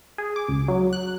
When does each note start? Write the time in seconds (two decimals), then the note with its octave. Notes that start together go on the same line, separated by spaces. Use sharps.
0.18 G#4
0.36 D6
0.48 C#2
0.68 F#3
0.93 F#6